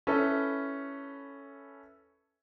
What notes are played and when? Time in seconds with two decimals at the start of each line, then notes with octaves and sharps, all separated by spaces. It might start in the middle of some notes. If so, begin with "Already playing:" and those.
0.07 C#4 E4 A4 B4